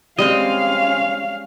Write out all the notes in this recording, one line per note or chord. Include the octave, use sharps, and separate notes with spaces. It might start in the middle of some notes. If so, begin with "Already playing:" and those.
G3 G#3 C4 C#4 D#5 F5